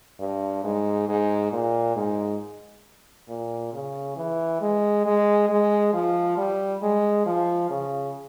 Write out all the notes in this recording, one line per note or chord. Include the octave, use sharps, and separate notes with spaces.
G2
G#2
G#2
A#2
G#2
A#2
C#3
E3
G#3
G#3
G#3
F3
G3
G#3
F3
C#3